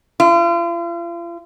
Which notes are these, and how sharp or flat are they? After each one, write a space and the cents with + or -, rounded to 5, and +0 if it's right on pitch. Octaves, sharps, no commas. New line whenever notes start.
F4 -40